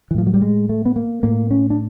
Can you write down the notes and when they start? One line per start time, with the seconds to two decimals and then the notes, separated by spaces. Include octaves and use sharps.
0.11 E3
0.15 A2 F3
0.27 F#3
0.34 G3
0.42 G#3
0.69 A3
0.85 B3
0.96 A#3
1.23 A2 A#3
1.51 C#4
1.70 D4